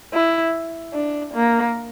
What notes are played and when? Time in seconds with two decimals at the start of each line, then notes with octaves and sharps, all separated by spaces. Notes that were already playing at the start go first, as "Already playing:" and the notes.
0.14 E4
0.94 D4
1.34 A#3